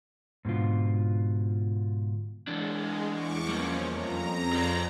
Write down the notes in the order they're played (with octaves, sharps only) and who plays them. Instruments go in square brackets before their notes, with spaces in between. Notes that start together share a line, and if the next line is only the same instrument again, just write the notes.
[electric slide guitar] G#2 B2 D3 F4
[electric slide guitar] E3 D4 [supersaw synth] G#3
[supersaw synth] E2 C#6 D6
[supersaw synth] F3 C#4 [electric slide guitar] G3 A#3
[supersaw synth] F2 A#5
[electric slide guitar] G#4 C5 D5